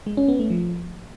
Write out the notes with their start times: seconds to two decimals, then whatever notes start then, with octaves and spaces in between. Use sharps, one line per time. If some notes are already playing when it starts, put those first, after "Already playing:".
0.06 G#3
0.17 C#4
0.28 B3
0.39 A3
0.50 F3